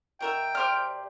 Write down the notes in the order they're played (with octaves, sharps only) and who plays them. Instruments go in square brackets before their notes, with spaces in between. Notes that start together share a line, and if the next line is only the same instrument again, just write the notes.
[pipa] B2 A#4 E5 [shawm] G5
[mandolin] G4 C5 F6 [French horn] D5